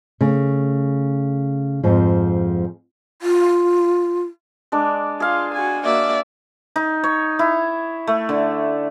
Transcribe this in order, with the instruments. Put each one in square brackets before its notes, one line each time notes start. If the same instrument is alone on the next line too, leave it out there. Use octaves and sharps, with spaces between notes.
[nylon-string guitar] C#3 A3
F2 G#2 F3
[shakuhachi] F4
[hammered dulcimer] G#3 D4 D6
[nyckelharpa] F4 [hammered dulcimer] G#4 F5
[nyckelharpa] F#4 G#5
[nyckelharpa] A#3 F#4 [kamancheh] D5 E5
[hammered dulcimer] D#4
C#5
E4
A3
D3